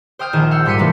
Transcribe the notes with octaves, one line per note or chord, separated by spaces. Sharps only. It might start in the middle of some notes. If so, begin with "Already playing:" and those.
C5 G5 D#6 F6 G6
A#1 D#3 D#4 G#4 D#5 E7
F5 F#5 E6 G6
G#2 G3 C6 B6 C#7 D#7
C3 E3 A3 A#3 D#4